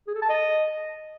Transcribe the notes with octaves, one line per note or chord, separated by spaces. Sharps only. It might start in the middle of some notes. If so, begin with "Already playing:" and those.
G#4
A4
A5
D#5